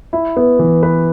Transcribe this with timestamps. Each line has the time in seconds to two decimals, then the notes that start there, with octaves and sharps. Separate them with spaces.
0.13 E4
0.37 B3
0.59 E3
0.83 B4